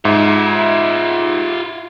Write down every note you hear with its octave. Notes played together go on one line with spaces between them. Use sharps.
G#2 F4 E5